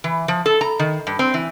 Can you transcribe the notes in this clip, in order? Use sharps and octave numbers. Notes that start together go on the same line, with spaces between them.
E3
F3
A4
A#5
D#3
G2
C4
E3